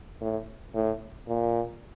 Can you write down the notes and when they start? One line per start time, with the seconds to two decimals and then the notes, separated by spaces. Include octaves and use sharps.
0.21 A2
0.75 A2
1.28 A#2